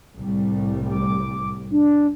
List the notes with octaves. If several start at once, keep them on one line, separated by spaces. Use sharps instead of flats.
C2 A2 G3
D6
D4